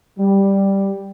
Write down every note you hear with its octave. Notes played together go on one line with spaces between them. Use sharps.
G3